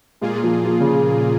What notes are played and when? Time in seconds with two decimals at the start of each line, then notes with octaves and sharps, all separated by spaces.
0.21 A#2 G#3 A#3 F4 G#4
0.44 F3
0.65 F3
0.80 C#3